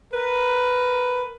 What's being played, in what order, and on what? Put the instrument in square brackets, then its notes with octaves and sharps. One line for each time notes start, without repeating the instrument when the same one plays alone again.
[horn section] A#4 B4